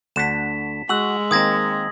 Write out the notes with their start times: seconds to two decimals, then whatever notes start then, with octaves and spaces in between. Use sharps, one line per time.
0.16 D2 D3 F#5 B6 E7
0.89 G#3 F#4 E6 F#7
1.31 D#3 A#3 C4 D#6 G#6 A#6